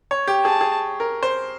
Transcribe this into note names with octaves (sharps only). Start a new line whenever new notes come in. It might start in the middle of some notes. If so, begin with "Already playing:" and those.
C#5
G4
G#4 A5
G#4
A#4
C5